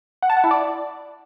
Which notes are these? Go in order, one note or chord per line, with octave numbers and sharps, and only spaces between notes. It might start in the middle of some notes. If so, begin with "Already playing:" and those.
F#5
A5
F#5
E4
D5